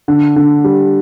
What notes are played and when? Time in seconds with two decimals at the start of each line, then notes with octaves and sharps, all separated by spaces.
0.08 D3
0.36 D3
0.64 G3